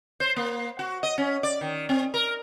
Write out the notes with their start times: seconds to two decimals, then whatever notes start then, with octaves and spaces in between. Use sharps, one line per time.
0.20 C5
0.36 A#3
0.79 F#4
1.03 D#5
1.18 C#4
1.43 D5
1.61 D#3
1.89 C4
2.14 A#4